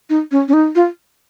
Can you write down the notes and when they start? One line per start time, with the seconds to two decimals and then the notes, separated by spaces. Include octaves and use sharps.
0.10 D#4
0.31 C#4
0.48 C#4
0.53 D#4
0.75 F4